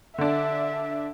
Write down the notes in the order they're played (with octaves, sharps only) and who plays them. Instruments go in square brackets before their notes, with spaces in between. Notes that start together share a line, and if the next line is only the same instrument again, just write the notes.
[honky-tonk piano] D3 D4 [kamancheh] E5